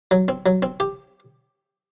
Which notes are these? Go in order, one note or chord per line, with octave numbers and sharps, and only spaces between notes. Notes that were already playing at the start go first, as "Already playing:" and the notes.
F#3
C4
F#3
C4
G4